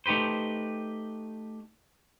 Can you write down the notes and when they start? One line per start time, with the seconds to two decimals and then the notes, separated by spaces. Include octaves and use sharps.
0.06 A3 D#4 G4 B4 C5